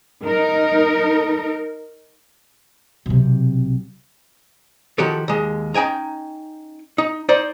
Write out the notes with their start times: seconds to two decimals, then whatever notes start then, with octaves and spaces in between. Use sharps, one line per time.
0.24 D#4 A#4
3.06 B1 C3
4.98 D#3 F3 F#4 G4 A4
5.28 D#2 G#3
5.74 C#4 D#4 G5 G#5 A#5
6.98 D#4
7.29 D#4 C5 D5